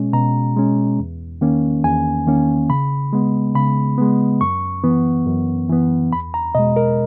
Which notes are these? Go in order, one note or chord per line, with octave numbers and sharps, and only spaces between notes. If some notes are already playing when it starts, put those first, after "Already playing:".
Already playing: B2 G#3 C#4
B2 A#5
G#3 C#4
E2
D#3 A#3 C#4
E2 G#5
D#3 A#3 C#4
C#3 B5
G#3 B3
C#3 B5
G#3 B3
F#2 C#6
E3 B3
F#2
E3 B3
E2 B5
A#5
B2 G#3 D#5
A#4